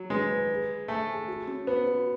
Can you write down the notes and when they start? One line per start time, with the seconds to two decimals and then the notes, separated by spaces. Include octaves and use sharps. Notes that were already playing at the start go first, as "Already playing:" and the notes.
Already playing: F#3
0.10 G#3 B4
0.30 B4
0.50 G#4
0.69 G#4
0.88 A3 G#5
1.08 G#4
1.29 F#4
1.48 C#4
1.67 B3 C#4
1.87 F#4